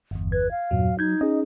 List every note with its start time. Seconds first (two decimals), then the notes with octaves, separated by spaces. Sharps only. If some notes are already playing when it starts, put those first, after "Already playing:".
0.11 G1 E2
0.32 B4 G#6
0.51 F5
0.71 E2 G2 A#2 F#3
0.99 D#4 G6 G#6
1.21 C#4 G#4 D#5